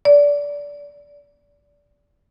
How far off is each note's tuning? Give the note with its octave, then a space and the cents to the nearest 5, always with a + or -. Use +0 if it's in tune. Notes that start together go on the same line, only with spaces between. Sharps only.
D5 -20